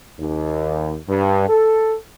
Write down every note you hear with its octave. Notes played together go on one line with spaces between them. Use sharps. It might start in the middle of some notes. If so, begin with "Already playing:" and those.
D#2
G2
A4